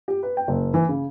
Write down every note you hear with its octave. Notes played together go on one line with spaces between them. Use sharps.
G4
B4
G5
F#1
E3
C#3